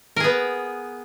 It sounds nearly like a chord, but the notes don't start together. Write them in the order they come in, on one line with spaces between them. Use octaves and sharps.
A#4 G#4 B3